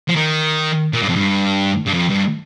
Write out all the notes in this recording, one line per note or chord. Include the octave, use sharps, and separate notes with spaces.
F3
D#3
A#2
G2
F2
G2
G2
F2
G2